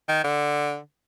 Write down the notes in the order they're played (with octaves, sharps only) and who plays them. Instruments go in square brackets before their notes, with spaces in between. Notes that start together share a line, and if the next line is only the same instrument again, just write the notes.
[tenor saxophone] D#3
D3